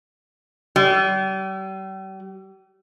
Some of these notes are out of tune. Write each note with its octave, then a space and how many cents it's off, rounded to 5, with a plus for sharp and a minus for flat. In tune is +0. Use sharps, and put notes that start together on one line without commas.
G3 -40